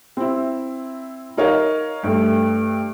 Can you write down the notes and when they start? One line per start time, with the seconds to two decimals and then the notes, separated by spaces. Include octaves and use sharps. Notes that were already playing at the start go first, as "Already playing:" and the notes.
0.17 C4 E4
1.37 D#4 A#4 C#5 D#5 F5
2.03 G2 A3